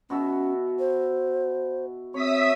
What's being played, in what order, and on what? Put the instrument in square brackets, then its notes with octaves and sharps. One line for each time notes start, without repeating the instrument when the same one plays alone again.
[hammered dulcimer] B2 F#4 E5 [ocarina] C#4
[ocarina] C5
[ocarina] C4 [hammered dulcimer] C#5 [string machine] E5 D#6 B6